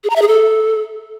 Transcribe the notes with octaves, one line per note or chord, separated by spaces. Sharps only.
G#4
A#5
E5
G#4
A4